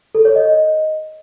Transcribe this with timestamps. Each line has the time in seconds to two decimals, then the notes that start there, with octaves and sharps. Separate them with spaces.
0.15 A4
0.25 C#5
0.35 D#5